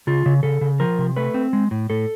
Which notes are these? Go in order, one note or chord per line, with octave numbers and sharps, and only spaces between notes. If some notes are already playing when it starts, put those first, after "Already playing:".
C#3 F4
C#3
C#3 A4
C#3
F3 A#4
C3
A3 B4
C4
G#3
A2
A2 A4